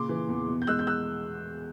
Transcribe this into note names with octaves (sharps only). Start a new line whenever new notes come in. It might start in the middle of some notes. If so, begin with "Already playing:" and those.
Already playing: A#2 C#3 C6 D6
E3
E2
B2
G6
G#3 E6 F#6
G6
E6 F#6